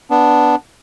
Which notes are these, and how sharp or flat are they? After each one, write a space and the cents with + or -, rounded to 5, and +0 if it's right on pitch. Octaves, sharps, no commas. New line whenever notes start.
B3 +0 D4 +0